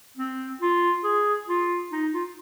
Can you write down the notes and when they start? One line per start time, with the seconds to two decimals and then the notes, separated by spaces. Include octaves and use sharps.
0.17 C4
0.61 F4
1.04 G#4
1.48 F4
1.92 D#4
2.14 F4